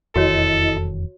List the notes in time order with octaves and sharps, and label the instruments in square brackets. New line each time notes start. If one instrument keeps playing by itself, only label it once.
[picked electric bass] E1 F2 D#3 [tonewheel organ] E4 D#5 [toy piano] F#4 C#5 [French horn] A4